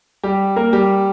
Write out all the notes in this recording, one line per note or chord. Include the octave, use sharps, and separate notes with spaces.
G3 G4
A#3 A#4
G3 G4